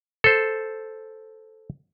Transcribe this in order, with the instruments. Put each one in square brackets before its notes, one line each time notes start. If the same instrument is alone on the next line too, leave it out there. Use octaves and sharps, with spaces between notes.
[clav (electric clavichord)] A4 C5